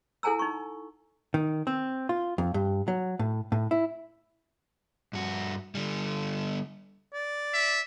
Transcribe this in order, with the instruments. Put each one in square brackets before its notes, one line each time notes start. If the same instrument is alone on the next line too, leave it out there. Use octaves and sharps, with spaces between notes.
[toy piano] E4 A4 F#5 G#5 A#5 E6
D#4 C#6
[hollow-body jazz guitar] D#3
C4
F4
F2
G2
F#3
A2
A2
E4
[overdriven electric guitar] G2 F#4
D3 G3
[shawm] D5
[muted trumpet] E5